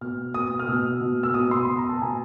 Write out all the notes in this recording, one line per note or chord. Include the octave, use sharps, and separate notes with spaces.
B2 F6
B2 D#6
F6
B2 E6
B2
E6
B2 D#6
C6
B2 B5
A#5
A5
B2 G#5